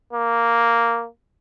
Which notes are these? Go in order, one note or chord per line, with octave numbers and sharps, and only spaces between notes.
A#3